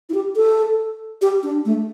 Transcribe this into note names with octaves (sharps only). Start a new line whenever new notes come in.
E4
G4
A4
G4
D4
A3